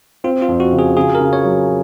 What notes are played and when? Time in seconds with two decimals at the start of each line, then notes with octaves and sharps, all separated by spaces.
0.24 C4 F4
0.42 F4
0.48 F2
0.60 F#4
0.72 C#3
0.79 G#4
0.97 C#3 G#4
1.15 A#4
1.20 C#3
1.33 C#5
1.44 F#3